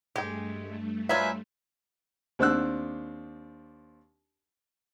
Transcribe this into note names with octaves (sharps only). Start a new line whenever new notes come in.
G2 G#3 A3 G4 G5
F#3 D4 F4 B4 C5 E5 G#5
D#2 C4 D4 E6 F#6